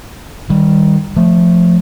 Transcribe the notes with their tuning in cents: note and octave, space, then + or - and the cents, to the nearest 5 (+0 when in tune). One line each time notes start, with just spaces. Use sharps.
D#3 +5 G3 +0
F3 +5 A3 +0